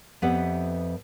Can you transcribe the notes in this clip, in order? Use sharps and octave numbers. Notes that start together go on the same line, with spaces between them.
F2 B3 G4 B4 E5 F#5